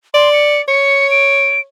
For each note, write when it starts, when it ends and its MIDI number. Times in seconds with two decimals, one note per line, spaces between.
0.14 0.60 74
0.14 0.31 84
0.33 0.62 97
0.68 1.66 73
0.68 1.10 97
1.11 1.60 98